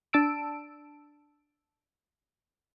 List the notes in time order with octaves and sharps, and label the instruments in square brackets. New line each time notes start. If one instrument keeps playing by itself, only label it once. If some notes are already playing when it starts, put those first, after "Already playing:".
[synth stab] D4 A5 E6 D7